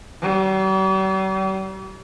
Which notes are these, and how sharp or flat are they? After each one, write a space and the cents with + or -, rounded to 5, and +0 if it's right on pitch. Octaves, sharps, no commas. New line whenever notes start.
G3 -45